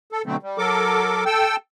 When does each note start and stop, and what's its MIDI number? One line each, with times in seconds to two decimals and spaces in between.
0.12 0.22 69
0.26 0.37 47
0.26 0.37 50
0.26 0.37 54
0.26 0.37 57
0.26 0.37 60
0.43 0.58 55
0.58 1.24 54
0.58 1.24 69
0.58 1.24 70
0.58 1.24 86
1.26 1.56 69
1.26 1.56 79
1.26 1.56 88